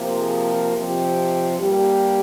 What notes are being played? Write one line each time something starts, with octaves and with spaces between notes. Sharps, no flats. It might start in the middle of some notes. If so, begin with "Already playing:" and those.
Already playing: C3 F3 A#3
G#4
F4
F2 C3 F3 G4
G2 G3 A#3 G4